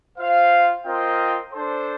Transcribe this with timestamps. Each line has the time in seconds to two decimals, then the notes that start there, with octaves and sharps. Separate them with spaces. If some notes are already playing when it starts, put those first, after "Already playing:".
0.17 F4 C5 F5
0.85 C4 F4 A#4 D#5 G5
1.53 D4 A4 C5